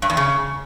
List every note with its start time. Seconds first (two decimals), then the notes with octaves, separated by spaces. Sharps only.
0.02 G2
0.10 E2
0.17 C#3